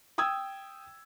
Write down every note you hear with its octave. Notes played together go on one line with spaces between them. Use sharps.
G5 D#6 E6 G#6